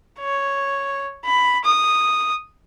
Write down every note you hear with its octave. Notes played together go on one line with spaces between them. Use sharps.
C#5
B5
D#6